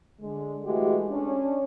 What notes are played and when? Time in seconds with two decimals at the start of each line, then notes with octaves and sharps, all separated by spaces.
0.22 D3 G#3
0.64 E3 G#3 A3 F#4 G4
1.11 C#4 D4